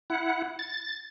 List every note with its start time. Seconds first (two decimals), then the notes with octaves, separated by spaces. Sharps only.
0.10 E4 F#5
0.59 A6